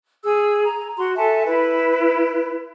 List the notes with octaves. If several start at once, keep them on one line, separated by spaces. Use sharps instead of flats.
G#4 E6
A#5
F#4 C6
A4 E5 G#5 A5
E4 B4